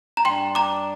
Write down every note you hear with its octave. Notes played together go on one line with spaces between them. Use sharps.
A#5
G2 G3 D4 G5 C6
A#5 D6